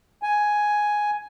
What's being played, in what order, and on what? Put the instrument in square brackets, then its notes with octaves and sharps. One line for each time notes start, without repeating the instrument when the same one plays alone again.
[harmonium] G#5